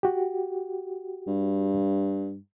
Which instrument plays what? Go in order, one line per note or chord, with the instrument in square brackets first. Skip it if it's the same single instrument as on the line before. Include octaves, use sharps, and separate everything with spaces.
[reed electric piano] F#4 G4
[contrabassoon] G2